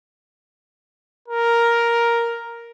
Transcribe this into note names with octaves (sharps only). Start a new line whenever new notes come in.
A#4